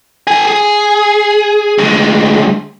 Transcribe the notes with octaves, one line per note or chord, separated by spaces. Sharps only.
A4 G#5
G#4
D2 G#3